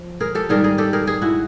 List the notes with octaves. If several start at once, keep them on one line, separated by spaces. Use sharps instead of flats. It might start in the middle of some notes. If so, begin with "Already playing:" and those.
Already playing: F3
G#4 A#4
G4 A4
G#2 D#3 G3 G#4 A#4
G#4 A#4
G4 A4
G#4 A#4
G#4 A#4
E4 F#4